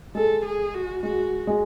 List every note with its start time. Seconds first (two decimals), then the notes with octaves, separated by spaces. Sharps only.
0.15 G#3 A4
0.45 G#4
0.74 F#4
1.03 G#3 F#4
1.47 G#3